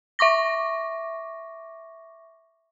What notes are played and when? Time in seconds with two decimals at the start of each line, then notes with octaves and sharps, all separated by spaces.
0.19 E5 C#6 D6 A#6